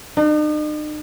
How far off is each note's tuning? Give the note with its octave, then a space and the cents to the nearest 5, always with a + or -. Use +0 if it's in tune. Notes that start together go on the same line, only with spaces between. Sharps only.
D#4 -45